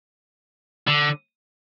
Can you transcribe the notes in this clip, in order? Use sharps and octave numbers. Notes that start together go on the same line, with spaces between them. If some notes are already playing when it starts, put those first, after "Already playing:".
D3